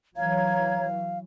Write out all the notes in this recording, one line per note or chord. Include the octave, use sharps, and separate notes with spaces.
E3 F#3 C#5 F5 A#5 G#6